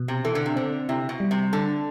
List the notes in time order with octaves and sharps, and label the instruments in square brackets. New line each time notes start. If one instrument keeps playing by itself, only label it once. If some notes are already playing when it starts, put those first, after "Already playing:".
Already playing: [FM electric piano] B2
[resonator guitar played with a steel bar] C3
[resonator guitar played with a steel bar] E3 [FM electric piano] A4
[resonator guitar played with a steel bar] D3
C3
[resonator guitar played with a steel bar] D3 [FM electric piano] C4
[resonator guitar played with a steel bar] C3 [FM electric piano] E4
[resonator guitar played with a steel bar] B2
[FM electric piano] G3
[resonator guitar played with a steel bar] C3
[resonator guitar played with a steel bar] D3 [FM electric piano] A4